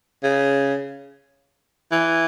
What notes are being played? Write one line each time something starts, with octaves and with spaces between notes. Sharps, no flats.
C#3
E3